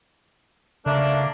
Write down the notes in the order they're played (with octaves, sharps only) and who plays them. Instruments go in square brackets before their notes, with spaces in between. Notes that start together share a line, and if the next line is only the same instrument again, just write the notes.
[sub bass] C#3 [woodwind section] A3 A#3 D4